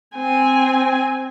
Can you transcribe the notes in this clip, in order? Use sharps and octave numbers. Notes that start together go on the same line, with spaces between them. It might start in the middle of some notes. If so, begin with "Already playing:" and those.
C4 G#5